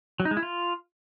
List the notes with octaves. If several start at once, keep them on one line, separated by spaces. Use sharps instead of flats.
F#3
D#4
G#3
E4
F4